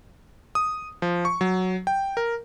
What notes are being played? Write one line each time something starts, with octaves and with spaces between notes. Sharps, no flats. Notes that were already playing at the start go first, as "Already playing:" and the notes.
D#6
F3
C#6
F#3
G5
A#4